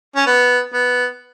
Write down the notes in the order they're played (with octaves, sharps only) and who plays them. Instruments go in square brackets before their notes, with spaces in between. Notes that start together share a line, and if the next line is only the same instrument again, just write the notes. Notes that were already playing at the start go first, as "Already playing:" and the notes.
[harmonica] C#4
B3
B3